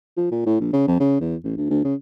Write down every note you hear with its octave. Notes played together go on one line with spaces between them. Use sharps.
F3
A#2
A2
A#1
C#3
F2
C#3
E2
A1
D2
D2
C#3